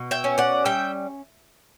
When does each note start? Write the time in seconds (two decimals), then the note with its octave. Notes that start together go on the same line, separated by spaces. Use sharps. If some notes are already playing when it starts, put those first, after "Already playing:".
Already playing: B2
0.11 E5 G5
0.24 C#4
0.38 D5 F#5
0.65 G3 E5 G5